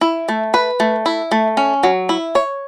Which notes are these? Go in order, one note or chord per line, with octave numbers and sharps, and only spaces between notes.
E4
A3
B4
A3
E4
A3
C#4
F#3
E4
C#5